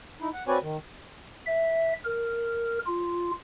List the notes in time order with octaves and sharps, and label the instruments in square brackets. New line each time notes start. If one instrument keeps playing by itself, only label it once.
[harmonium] D#4 E4
F#5
C4 F#4 B4 C#5 D5 G#5
D#3
[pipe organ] E5
A#4
F4